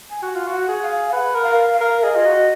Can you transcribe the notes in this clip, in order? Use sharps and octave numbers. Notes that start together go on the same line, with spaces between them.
G#5
F#4 F#5
F4
F#4
F#5
G#4
F5
F5
B4 F#5
A#4
F5
F5
A#4
G#4 D#5
F4
F#4